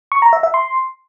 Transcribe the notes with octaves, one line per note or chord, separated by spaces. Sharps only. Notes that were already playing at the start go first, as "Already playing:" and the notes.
C#6
A#5
E5
E5
C6